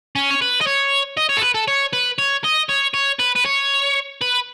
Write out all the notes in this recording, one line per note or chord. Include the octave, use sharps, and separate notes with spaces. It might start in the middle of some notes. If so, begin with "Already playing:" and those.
C#4
C#5
B4
D#5
C#5
D#5
C#5
A4
B4
A4
C#5
B4
C#5
D#5
C#5
C#5
B4
B4
C#5
B4